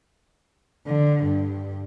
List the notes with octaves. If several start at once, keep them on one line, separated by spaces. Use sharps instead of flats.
D3
G2